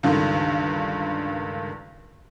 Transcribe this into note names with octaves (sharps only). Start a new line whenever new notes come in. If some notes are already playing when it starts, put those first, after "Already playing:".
C#2 G2 D3 D#3